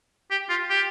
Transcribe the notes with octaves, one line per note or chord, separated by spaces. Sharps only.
G4
F4
G4